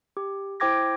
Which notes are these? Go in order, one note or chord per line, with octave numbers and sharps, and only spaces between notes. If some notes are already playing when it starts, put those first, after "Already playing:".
G4
E4 C5 G5 D6 G#6 A#6